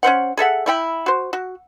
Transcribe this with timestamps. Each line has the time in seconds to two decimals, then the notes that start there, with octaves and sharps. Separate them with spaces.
0.03 C#4 D4 C5 F#5
0.37 G#4 A4 E5 F#5
0.66 A3 E4 G5 B5
1.06 F#4 C5
1.33 F#4